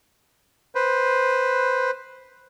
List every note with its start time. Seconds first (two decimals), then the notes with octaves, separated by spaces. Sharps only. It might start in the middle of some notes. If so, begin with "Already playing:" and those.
0.75 B4 C5